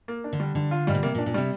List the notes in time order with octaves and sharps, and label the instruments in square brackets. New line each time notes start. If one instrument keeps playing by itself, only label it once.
[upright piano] A#3
D4
[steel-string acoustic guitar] D3
[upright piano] G3
[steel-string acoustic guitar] D3 [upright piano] D4
[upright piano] F4
[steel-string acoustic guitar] G#2 [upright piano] G3
[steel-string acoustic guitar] A#2
[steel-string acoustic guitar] C3 [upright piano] A#3
[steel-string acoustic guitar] A#2
[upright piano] D4
[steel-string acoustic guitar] A#2
[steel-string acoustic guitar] C3 [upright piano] G3